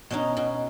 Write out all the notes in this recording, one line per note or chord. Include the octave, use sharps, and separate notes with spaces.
B2 C#4 D#4
B2